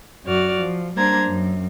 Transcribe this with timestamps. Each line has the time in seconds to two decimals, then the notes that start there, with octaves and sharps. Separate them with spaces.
0.25 F#2 F#4 D5 F6
0.58 F3
0.96 G3 A#3 D4 C5 A#5 G#6
1.27 F#2